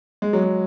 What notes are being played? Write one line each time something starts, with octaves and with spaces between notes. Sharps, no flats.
G#3
F#3
G#3